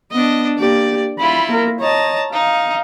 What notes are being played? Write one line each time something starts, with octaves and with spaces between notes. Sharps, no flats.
B3 D4 D#5
A#3 G4 D5
E4 F4 B5
A#3 A#4
C#5 D#5 A5 A#5
D#4 F5